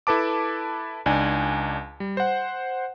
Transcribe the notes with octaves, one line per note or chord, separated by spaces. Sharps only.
E4 A4 B4 A5 D6
C#2 D4 D#4 G#5
G3
C5 F#5